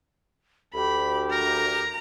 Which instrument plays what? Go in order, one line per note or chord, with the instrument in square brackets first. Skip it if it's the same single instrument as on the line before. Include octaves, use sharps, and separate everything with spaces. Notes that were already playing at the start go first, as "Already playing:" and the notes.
[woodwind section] D2 [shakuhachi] G4 [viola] B5
[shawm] A#4 [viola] A#5